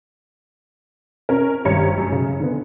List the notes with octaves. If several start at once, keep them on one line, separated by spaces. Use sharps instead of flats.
C#4 A#4
G#1 G2 C#5 A#5 C#7
F#2 F#3
C#3
D3 B3